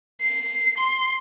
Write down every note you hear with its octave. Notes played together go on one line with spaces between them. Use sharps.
C7
C6